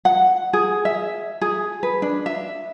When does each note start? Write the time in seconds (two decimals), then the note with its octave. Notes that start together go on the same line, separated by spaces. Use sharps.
0.05 F#5
0.53 G#4
0.85 E5
1.41 G#4
1.83 B4
2.02 D4
2.26 E5